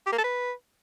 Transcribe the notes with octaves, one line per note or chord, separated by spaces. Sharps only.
G4
A#3
A4
B4